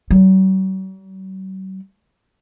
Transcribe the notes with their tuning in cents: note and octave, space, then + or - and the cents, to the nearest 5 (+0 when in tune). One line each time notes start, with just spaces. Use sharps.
F#3 +45